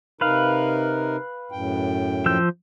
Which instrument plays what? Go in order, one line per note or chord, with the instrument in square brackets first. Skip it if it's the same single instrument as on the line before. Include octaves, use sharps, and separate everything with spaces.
[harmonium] C3 D#4 A#4 [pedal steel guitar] B4 F5
[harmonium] F#2 A2 G5
[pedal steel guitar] F3 E6 G6